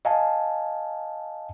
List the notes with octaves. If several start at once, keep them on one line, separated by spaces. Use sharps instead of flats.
D#5 F5 G#5 A5